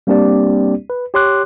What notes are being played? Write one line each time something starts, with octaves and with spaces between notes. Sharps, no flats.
G3 A#3 C4 D4 G4 D5
B4
G4 C#5 C6 D6 F#6